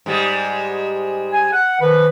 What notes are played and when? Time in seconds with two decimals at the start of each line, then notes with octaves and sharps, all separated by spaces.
0.06 G#2 G3 G#3
1.32 G#5
1.52 F#5
1.80 D#3 F3 B4